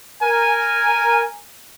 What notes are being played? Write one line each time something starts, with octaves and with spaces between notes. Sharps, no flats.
A#4 G#5